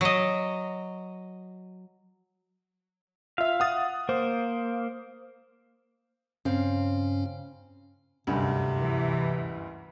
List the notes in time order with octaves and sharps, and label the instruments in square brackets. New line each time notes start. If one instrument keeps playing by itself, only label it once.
[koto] F#3 D#5
[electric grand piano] F4 E5 [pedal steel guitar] F5
[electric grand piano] F#5 D#6 A6
[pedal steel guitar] A#3 [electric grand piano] C5
[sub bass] G2 [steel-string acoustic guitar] C#3 C4 F5 [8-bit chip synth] C#4
[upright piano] F#1 D2 G2 [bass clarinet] C3
[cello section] E3